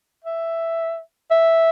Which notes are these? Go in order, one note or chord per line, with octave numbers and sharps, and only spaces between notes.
E5
E5